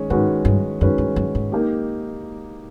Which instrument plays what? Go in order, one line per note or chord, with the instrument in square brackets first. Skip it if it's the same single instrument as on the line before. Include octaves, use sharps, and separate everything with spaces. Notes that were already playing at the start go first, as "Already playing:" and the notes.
Already playing: [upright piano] D#3 G#3 C#4
[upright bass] G#2 [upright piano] D#3 G#3 C#4 F#4 B4
[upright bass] G2
[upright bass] F#2 [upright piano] D#3 G#3 C#4 F#4 B4
[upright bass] G2
F#2
G#2
[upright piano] A#3 D#4 G4